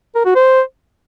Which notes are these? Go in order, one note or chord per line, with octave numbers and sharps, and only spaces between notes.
A#4
F#4
C5